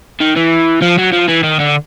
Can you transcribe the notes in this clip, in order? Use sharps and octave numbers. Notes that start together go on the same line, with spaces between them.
D#3
E3
F3
F#3
F3
E3
D#3
D3